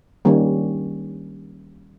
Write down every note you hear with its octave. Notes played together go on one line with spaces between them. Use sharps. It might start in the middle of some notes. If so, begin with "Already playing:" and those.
D#3 G3 A#3 C#4